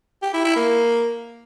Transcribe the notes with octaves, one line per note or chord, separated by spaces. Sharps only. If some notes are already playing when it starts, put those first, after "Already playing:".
G4
E4
E4
A#3